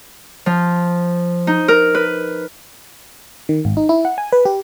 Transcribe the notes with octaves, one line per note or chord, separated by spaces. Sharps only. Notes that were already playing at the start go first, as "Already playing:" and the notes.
F3
D#4
A#4
B4
D#3
G#1
D#4
E4
F#5
G#5
B4
G4